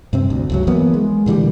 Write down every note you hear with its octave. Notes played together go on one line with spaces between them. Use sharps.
G2 C3 C4
D2
C#2 G2 F#3
E3 F#3 A#3 B3
G#3
A#2 D3 E3 G3